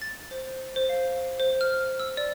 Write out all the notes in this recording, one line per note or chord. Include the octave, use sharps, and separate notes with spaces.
A6
C5
C5
F5
C5
F6
E6
D5